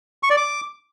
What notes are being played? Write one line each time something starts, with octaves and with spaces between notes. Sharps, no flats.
C#6
D5
D6